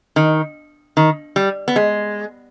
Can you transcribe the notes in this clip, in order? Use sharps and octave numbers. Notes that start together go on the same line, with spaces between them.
D#3
D#3
G3
B3
G#3